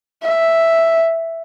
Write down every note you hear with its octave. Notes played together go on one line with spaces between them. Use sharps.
E5